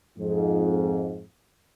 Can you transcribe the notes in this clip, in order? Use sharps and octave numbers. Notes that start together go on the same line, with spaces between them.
F2 G#2